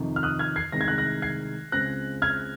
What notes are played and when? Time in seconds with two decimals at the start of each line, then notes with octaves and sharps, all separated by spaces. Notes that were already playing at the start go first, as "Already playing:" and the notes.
Already playing: F2 C3 D#3
0.16 F6
0.23 D#6 F#6
0.39 F6 G#6
0.56 G#6 C7
0.72 C2 C3 D#3 G#3 A#6
0.81 G#6
0.88 F#6 A#6
0.98 F#6 A#6
1.22 G#6 C7
1.72 C#2 C#3 G#3 C4 F#6 A#6
2.22 F6 G#6